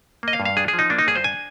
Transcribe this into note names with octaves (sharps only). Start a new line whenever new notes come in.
A#3 D#5
F5
G2
F5
D4 G#4
G#4
F3
D#4
A#3 D4
D#4
G2 G#4
C5
D4 G#5